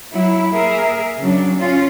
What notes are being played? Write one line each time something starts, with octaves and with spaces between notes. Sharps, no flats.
F#3 E4
A#3 G#4 A#4 E5
C#3 F#3 D4
C#4 F4